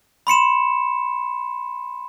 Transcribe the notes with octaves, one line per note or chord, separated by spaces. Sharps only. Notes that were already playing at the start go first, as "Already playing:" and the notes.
B5 C6 C#7 E7